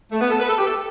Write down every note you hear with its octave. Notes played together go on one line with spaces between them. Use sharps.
A3
B3
A4
B4
A4
G4
A4